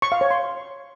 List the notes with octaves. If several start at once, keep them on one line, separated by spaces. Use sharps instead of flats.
C#6
F5
C#5
C6